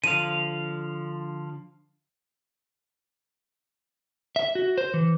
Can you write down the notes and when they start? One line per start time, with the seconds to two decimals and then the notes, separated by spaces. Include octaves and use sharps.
0.04 D3 F3 F5 D#7
4.36 E5
4.55 F#4
4.78 C5
4.94 E3